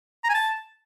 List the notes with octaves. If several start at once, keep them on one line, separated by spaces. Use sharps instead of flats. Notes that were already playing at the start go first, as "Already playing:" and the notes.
A#5
G#5
A5